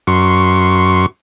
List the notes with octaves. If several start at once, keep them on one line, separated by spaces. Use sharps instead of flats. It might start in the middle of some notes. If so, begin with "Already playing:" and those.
F#2 C6 C#6